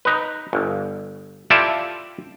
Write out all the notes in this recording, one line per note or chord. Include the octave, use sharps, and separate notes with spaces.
D#4 B4
G1
E4 F4 G4 A4 D5 E5